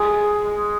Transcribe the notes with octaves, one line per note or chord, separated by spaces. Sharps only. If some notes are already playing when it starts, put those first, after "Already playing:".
Already playing: G#3 G#4 G#5
G#3